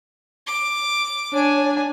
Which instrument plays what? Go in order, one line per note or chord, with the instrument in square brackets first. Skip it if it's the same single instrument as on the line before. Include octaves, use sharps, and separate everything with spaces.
[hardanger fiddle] D6
[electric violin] D4 G#5 [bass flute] C#5